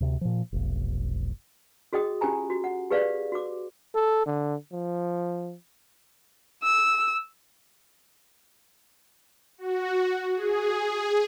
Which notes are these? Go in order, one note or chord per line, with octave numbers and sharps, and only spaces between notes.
D2 C3
A#2 F3
F1 B1
F#4 G#4 D#5 G5 D#6
C#4 F4 G4 G#5 A#5
F#4
F#5
G4 G#4 B4 D5 F5
F#4 D6
A4
D3
F3
E6
F#4
G#4